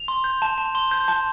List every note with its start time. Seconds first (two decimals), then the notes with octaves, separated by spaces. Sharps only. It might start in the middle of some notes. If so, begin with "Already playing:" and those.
Already playing: F7
0.08 C6
0.24 G6
0.42 A5
0.58 A5
0.75 C6
0.91 G6
1.08 A5